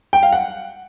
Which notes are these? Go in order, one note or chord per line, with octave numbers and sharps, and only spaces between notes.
G5
F5
F#5